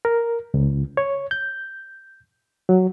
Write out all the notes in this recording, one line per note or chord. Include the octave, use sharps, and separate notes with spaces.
A#4
C#2
C#5
G6
F#3